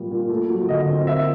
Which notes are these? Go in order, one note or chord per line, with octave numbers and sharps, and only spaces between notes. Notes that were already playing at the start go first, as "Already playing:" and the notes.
Already playing: A#2 G3 A#3
A#2
A3
F#3
D3 D#5
C4
A#3 E5